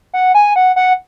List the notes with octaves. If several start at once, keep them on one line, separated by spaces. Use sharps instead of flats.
F#5
G#5
F#5
F#5